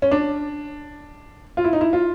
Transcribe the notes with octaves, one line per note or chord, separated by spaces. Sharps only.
C#4
D4
F4
E4
D#4
E4
F4